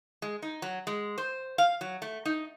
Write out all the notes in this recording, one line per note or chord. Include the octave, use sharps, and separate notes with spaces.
G#3
D#4
F#3
G#3
C5
F5
F#3
A3
D#4